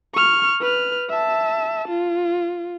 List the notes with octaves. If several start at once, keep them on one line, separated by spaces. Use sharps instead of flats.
C#6 F6
B4 F6
E5 A5
F4